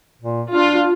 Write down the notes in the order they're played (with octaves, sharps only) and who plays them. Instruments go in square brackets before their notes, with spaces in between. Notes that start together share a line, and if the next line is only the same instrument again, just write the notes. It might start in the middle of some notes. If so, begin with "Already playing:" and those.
[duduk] A#2
[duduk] D4 [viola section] F4